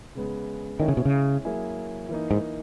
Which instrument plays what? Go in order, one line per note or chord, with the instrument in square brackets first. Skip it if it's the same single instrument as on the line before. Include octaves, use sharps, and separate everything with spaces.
[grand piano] C#3 G#3 B3
[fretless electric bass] D#3 [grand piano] G#3 C#4 E4
[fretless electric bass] C#3
B2
C#3
[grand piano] F#3 A#3 E4 G#4
E3 A#3 D#4
[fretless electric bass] G#2